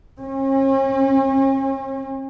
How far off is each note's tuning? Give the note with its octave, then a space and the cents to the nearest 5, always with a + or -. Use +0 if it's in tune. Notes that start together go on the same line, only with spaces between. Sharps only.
C#4 -45